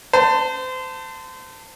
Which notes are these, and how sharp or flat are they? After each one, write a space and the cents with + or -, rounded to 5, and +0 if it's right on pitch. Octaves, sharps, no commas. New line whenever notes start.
C5 -30 A5 +20